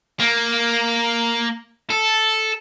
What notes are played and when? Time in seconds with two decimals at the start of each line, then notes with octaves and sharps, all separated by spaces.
0.20 A#3
1.90 A4